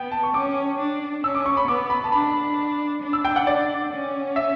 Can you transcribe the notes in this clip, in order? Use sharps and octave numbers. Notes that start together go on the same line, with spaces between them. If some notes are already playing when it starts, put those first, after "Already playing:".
Already playing: B3 G5
A5
C#6
C#4 D6
D4
C#4 E6
D6
C#6
B5
B3 D6
B5
A5
D4 B5
D4
E6
G5
F#5
D5
C#4
E5